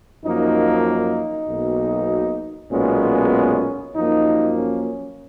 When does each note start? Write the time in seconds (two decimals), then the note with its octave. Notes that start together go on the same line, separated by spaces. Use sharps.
0.25 F#2 F3 A#3 D#4
0.87 D#4
1.48 B1 B2 A#3
2.72 B1 A#2 G#3 B3 C#4
3.95 F#2 F3 A#3 D#4
4.57 C#4